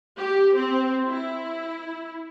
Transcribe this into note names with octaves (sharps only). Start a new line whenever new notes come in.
G4
C4
E4